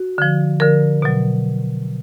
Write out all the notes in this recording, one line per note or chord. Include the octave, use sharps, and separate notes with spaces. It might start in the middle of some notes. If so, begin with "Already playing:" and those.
Already playing: F#4
D3 F3
D3 F3 A#4
B2 F#3